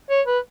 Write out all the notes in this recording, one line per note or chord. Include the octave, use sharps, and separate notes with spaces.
C#5
B4